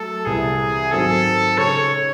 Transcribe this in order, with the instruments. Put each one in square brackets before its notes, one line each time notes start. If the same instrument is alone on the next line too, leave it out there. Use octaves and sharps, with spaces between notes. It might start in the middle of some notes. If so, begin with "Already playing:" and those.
Already playing: [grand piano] F#3 A3 [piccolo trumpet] A4
[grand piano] C2 C3 E3 [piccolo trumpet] G#4
[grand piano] G#2 D#3 F#3 C4 [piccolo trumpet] A4
[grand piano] C#3 G#3 D#4 [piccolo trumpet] C#5